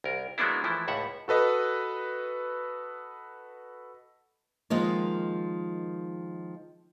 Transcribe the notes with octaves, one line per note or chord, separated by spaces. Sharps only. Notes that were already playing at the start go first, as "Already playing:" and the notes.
C2 A#4
F#3 G#3 A#3 B3 D4 E4
E3 F3 A3 E4
C#2 A2 E5 F#5
F#4 A4 B4 D#5
D#3 F3 G#3 A#3